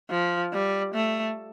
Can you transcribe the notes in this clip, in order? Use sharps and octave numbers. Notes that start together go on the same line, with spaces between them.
F3
G3
A3